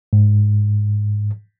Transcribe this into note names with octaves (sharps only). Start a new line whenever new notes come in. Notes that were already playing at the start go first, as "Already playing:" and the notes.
G#2